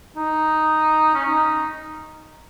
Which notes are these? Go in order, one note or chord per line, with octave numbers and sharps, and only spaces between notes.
D#4
C#4
D#4